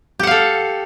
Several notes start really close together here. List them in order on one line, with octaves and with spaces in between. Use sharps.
G4 F#5 F5 A4